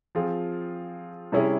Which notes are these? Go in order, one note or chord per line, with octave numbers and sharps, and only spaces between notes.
F3 C4 F4 G#4
C3 G3 C#4 E4 G#4